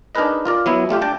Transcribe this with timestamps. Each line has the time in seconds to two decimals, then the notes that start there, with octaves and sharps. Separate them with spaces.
0.15 D4 D#4 G#4 A#4 B4 D#5
0.45 F4 A#4 D5
0.66 F#3 B3 E4
0.89 G3 A3 F4 G4
1.01 D4 G5 A5